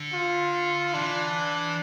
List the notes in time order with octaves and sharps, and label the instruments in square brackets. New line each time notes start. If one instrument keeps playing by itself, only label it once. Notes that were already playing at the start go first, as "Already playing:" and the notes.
Already playing: [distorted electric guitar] D3
[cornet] F4
[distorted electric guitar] E3 [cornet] D4